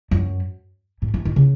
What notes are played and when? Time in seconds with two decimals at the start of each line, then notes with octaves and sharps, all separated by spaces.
0.11 F#2
1.02 A2
1.14 E3
1.25 D#3
1.36 C#3